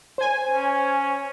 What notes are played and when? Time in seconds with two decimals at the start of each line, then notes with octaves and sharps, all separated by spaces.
0.18 C5 G#5
0.48 C#4